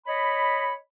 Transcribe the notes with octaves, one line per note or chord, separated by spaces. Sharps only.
C#5 D#5 B5